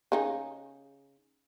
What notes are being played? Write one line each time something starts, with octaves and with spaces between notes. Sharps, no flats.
C#3 D#4 G#4